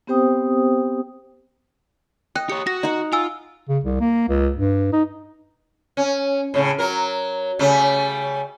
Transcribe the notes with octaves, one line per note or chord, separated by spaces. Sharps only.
B3 C4 G4 C5 G5 D#6
D#5 G5 F#6
G4 C#5 C#7
F#4 A#6
D#4 F#5
F4 G#5 E6
C#3
C2
A#3
C#2
G2
D#4
C#4
A2 C#3
F#3 A#4
C#3 G3 A3